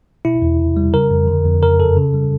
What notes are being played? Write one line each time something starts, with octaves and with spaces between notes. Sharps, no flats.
B2 E4
E2
C3
G3
C#3 A#4
F2
D3
F2
C#3 A#4
F#2 A4
C#3
G3